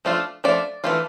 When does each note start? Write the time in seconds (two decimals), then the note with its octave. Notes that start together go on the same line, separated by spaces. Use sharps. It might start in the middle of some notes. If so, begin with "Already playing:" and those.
0.05 F3 A3 D4 F4
0.44 F3 A3 D4 D5
0.84 E3 A3 D4 F4